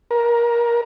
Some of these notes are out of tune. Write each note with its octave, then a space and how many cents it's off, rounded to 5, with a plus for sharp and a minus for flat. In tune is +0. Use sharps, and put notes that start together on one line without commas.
A#4 +20